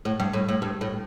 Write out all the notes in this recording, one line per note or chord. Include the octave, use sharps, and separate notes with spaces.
A2
G2
A2
A2
G2
A2